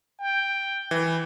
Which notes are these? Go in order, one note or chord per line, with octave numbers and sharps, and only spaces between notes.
G5
E3